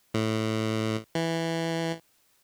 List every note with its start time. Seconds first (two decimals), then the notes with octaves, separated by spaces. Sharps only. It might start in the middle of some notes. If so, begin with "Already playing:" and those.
0.14 A2
1.15 E3